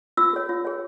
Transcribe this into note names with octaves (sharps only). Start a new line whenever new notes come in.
F4 E6
G#4 C#5
F4
G#4 C#5